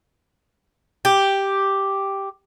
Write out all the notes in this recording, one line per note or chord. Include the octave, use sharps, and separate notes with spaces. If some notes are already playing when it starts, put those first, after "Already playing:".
G4